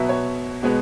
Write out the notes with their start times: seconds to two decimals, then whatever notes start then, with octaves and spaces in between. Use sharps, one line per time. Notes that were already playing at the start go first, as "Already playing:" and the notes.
Already playing: B2 F#3 B3 E5
0.09 C#5
0.63 B2 G#3 B3